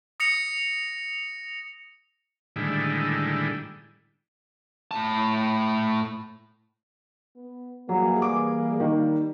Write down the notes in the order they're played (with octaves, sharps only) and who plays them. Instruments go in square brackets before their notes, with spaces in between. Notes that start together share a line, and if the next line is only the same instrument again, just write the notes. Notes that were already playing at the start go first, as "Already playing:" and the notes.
[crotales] D#6 A#6 C#7 F7
[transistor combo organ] A2 D3 D#3 G3 G#3 E4
[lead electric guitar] A2 A5
[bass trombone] B3
[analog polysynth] E3 G3 G#4 [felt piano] F#3 [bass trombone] A#3
[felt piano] D6
[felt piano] D#3 [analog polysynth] G3